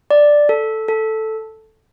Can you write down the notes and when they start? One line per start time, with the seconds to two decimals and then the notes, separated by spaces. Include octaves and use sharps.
0.11 D5
0.49 A4
0.88 A4